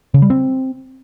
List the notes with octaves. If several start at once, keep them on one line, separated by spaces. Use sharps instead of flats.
C#3
G3
C4